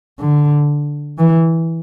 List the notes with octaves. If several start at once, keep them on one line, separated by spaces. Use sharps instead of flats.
D3
E3